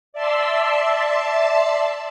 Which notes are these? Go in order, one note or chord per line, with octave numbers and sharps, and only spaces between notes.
D5 E5 A5 C6 E6